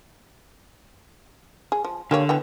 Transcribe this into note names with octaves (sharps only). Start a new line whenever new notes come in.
G#4
F3
D3 A#3 G4 C#5
E3 B3 G5